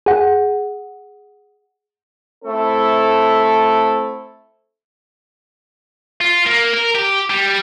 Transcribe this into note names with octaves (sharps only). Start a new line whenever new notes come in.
G#4 F#5
A3 C4 E4 A4
F4
A#3
A#4
G4
G3